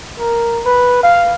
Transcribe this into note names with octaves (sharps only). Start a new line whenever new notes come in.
A#4
B4
F5